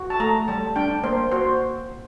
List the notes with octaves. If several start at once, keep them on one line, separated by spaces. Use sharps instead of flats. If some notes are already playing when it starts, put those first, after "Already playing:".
Already playing: F#4
A5
A3 A#5
G3 A5
D4 G5
A#3 C5
F#4 C5